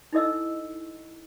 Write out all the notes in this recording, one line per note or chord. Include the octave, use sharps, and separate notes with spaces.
D#4 E4 A4 D#5 E6